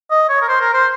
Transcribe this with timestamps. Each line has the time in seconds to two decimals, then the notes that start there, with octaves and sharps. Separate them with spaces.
0.11 D#5
0.29 C#5
0.42 A#4
0.48 C5
0.61 A#4
0.74 C5